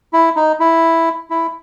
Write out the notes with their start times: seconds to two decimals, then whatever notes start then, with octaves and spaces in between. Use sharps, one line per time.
0.13 E4
0.36 D#4
0.60 E4
1.30 E4